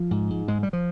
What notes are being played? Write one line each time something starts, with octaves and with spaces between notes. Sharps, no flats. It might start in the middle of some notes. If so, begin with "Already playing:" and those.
Already playing: F3
G#2
G#2
G#2 G#3
G3
F3